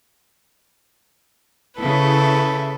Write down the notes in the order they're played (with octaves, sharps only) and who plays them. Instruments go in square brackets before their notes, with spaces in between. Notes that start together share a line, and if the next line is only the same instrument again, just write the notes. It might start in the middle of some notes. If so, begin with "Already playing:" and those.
[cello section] C#3 E4 [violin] A4 B4